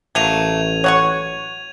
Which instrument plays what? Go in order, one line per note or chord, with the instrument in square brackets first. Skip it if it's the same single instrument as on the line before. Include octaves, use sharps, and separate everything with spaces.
[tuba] A1 [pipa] F#3 A3 A#3 [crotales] G#6 D#7 F7
[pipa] F#3 F#5 C#6 [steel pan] C#5